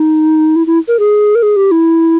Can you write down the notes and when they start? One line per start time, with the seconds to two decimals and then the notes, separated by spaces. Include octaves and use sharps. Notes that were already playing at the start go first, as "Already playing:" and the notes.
Already playing: D#4
0.56 E4
0.67 E4
0.88 A#4
0.99 G#4
1.35 A#4
1.43 G#4
1.56 G4
1.71 E4